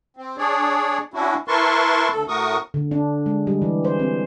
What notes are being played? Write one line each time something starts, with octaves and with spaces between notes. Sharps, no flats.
C4
D4 G#4 C#5 D5
C#4 D4 E4 F#4
E4 A#4 B4 A5 C6 C#6
D2 A4
A2 A3 F#4 A#4 C#6 D#6
D3
D4
G#3
G3
E3
C5
C4